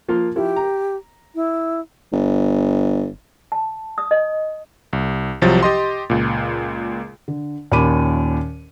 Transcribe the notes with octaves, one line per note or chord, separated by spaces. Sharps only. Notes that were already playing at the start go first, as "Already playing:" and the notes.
F3 A#3 F4
F3 E4 G4
A#5
E4
G1
A5
D#6
D#5
C2
C2 C3 F3 F#3 A6
G4 D#5 C6
C#2 A#2
D3
D#2 A#2 C#4 B5 D6 D#7